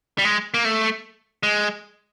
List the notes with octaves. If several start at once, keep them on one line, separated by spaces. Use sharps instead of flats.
G3
G#3
A#3
A3
G#3